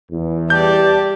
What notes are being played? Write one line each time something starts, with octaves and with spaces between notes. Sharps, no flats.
E2
G3 G4 D5 A5 G6